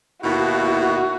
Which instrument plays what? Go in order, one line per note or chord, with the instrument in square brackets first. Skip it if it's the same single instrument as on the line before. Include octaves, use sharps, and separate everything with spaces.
[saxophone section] D#2 B2 [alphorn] E4 [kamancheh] F#4